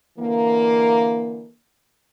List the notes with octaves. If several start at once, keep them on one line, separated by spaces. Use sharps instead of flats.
D3 E3 A#3